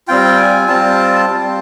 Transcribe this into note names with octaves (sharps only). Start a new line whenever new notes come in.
G3 C4 F4 G5
G#5
G3 C4 F4 A5
G3 C4 F4